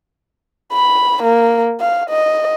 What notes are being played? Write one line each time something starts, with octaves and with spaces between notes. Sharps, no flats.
B5
A#3
F5
D#5